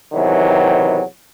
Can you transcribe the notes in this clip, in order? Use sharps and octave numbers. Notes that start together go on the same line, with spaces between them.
E2 C3 D#3 E3 F#3